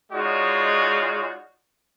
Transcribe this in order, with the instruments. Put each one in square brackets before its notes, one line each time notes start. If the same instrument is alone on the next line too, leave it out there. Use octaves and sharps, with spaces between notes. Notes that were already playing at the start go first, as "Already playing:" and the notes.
[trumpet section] G#3 D#4 F4 F#4 C#5 D5